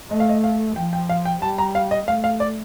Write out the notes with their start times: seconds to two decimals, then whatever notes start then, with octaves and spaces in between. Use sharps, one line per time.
0.11 A3 D#5
0.20 F5
0.29 D#5
0.44 F5
0.76 F3 G5
0.93 G5
1.09 F5
1.25 G5
1.42 G3 A5
1.58 A#5
1.75 F5
1.91 D#5
2.07 A3 F5
2.24 F5
2.40 D5